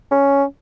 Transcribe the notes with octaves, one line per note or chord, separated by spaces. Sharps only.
C#4